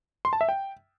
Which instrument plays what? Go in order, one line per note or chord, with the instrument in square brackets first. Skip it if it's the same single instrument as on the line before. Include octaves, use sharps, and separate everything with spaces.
[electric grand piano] C6
A5
E5
G5